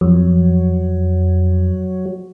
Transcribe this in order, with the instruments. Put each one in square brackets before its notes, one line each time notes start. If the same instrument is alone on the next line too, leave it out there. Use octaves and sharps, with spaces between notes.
[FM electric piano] F2 [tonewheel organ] F#3